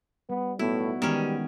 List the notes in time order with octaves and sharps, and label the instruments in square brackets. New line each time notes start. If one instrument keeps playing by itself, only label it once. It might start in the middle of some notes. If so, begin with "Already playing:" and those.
[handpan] G3 [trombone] B3
[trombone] A2 [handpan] B3 D#4 F#4 [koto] E4
[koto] D#3 C#4 [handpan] E3 G#3 B3 [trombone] G3